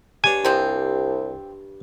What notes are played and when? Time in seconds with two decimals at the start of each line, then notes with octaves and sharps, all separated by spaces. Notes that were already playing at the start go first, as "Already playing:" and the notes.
0.24 G2 D4 C#5 G#5
0.45 C2 F3 C4